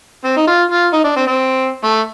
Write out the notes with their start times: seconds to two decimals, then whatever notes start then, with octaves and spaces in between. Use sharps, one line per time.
0.24 C4
0.37 D#4
0.47 F4
0.71 F4
0.93 D#4
1.04 D4
1.16 C4
1.27 C4
1.84 A3